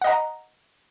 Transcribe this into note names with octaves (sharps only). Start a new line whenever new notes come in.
D#5 F#5 A#5